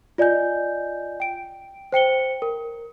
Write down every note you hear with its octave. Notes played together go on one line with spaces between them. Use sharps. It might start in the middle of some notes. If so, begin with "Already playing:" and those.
F4 D5 D#5 G#5 G6
G5 D7
C5 G5 C#7 G7
A#4